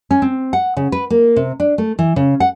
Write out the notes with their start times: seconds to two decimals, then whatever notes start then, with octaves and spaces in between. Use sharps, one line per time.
0.11 C#4
0.22 C4
0.53 F#5
0.77 C#3
0.92 B4
1.10 A#3
1.36 C3
1.60 D4
1.78 A3
1.99 E3
2.16 C#3
2.40 F#5